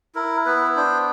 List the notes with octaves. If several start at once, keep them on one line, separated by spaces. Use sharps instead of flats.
E4 A#4
B3 B4
D4 C5